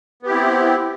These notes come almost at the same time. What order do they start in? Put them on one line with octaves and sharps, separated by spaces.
B3 G4 E4 C4